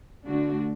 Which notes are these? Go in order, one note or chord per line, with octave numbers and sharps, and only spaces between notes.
D3 A3 D4 F#4